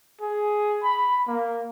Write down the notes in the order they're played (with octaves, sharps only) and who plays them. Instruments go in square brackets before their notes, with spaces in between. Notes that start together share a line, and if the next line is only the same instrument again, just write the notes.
[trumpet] G#4
B5
A#3